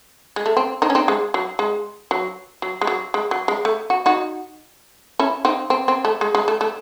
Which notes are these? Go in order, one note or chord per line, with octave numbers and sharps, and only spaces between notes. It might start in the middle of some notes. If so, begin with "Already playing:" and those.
G#3
A3
C4
C4 D#4
C#4
C4 D#4
G#3
F#3
G#3
F#3
F#3
G#3
F#3
G#3
F#3
G#3
A3
F#4
D#4 F#4
C#4 E4
C4 D#4
C4
C4
A3
G#3
G#3
A3
A3